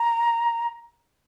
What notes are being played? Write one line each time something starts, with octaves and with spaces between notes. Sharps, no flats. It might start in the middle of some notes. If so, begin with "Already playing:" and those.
Already playing: A#5